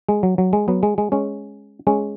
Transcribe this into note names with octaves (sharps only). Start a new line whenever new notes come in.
G#3
F#3
F#3
G#3
F#3 B3
G#3
G#3
G#3 C#4
G#3 C#4